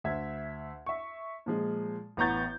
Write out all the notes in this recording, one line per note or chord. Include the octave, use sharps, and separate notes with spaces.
D2 E5 G#6
E5 C#6
A#2 F3 G#3
A1 B3 A#5 C#6 G6 A6